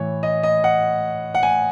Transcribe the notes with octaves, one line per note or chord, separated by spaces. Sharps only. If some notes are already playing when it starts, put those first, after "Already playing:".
Already playing: A2 E3 C#5
D#5
D#5
F#5
F#5
G#5